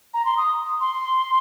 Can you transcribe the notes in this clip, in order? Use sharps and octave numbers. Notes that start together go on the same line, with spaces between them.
A#5
C6
D#6
C6